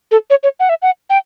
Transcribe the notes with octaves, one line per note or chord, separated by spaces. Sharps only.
A4
C#5
C#5
F#5
E5
F#5
G5